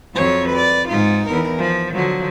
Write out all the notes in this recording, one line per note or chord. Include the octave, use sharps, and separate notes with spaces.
F2 F#3 C#5
B4 D5
G#2 D#4 F4
E2 A#4
F3
D3 F3 F#3